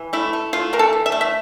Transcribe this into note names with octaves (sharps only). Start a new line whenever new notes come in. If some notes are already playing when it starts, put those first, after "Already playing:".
Already playing: E3
A3 E4
A3
A3 F4
E3 A#4
A4
E3
E5
A3
E5